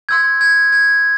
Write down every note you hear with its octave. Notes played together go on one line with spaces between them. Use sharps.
C6 E6 G6 G#6
G#6
G#6